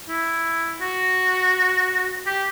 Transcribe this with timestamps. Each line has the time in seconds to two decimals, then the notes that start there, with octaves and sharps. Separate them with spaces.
0.08 E4
0.81 F#4
2.26 G4